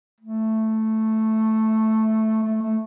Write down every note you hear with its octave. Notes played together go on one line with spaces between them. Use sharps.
A3
A3
A3